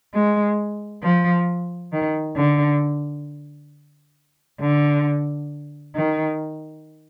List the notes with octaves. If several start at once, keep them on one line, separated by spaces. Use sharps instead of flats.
G#3
F3
D#3
D3
D3
D#3